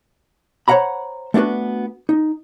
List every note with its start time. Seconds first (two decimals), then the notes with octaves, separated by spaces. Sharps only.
0.68 C5 C#5 F5 F#5 A#5 B5
1.34 A3 B3 D4 F#4 B4
2.09 D#4